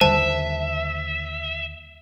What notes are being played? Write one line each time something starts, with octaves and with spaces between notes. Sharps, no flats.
D#2 D3 G3 C5 E5 A5